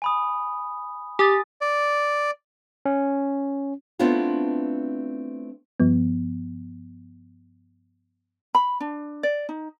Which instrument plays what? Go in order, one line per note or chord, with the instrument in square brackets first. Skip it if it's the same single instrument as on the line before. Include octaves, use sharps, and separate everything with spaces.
[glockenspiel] G#5 B5 D#6
[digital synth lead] G4 [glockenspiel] G#5 D#6 A6
[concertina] D5
[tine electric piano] C#4
[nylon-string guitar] A3 B3 C4 D4 E4 F4
[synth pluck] G2 F3 B3
[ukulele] B5
D4
D5
D#4